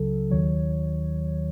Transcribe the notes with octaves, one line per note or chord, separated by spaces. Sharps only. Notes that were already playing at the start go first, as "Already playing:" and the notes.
Already playing: C#2 C#3 F#3 A4
D#2 D#3 F#3 C#5